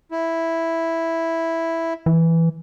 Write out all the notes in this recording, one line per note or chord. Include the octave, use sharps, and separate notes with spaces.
E4
E3